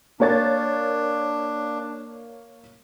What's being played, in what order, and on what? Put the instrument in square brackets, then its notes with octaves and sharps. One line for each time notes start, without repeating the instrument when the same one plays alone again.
[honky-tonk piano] A#3 C#5 A6 [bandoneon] D4